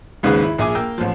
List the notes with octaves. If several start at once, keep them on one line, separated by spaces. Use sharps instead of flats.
G#1 D#2 G#2 C#3 G#4 B4
E4
A#1 G#4 E5 G#5 D6
A#3 G5 E6
A1 F3